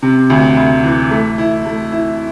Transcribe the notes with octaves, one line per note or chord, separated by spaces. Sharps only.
C3
D2
D2
E3
A3
E4
A3
E4